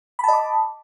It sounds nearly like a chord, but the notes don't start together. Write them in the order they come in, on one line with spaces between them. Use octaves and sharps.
B5 A5 D#5 D6